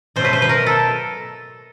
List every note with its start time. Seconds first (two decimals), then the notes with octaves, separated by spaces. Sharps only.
0.16 B2 F#3 A3 C5
0.25 B4
0.33 C5
0.42 B4
0.49 A#4
0.66 A4